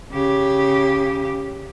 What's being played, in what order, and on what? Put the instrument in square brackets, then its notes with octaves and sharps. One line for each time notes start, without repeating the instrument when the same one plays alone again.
[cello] C#3 G4